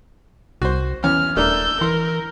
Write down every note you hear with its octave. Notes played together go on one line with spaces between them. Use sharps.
C2 F#4 C5
E2 C#4 F6
D#1 A3 D4 A#4 E6 G6
E3 A#4 C6